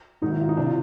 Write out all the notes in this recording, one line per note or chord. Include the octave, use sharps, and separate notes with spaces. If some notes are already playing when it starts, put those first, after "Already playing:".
G#2 D#3 F#3 D#4
E4
F4
D#4
C3 E3 D4
F4